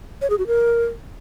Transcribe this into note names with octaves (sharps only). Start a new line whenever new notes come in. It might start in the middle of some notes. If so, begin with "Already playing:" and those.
C#5
G#4
F#4
A#4